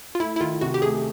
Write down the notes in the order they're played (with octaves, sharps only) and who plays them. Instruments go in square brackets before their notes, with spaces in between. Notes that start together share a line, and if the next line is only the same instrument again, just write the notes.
[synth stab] F4
[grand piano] A3 [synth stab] E4
[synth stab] E4
[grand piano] D#3 [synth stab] F4
[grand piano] C3 [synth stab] F#4
[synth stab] G4
[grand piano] A3 [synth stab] G#4